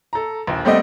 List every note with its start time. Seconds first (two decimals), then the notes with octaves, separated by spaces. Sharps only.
0.13 A4 A#5
0.47 A#1 D#2
0.65 G3 A3 C4 D5 D#5 F#5